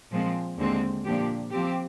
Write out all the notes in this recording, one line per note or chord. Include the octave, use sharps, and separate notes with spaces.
A#2 F3 G#3 C4
D#2 D3 G#3 C4
A#2 F3 A#3 D4 G4
F3 C4 G4